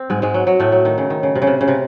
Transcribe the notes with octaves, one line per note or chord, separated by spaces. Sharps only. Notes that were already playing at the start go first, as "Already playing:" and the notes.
Already playing: C4
G#2 G#3
G#2 G#3
F#3
F#3
A2 A3
F#3
D#3
C#3
D#3
C#3
C3
C#3
C3
C#3
C3